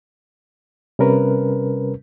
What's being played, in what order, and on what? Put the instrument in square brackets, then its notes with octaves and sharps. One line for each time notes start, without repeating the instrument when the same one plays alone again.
[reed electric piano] C3 G3 C#4 A#4 B4